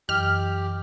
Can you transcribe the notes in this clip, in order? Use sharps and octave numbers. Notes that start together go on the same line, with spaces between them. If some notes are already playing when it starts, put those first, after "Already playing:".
F#2 E3 G4 D#5 F6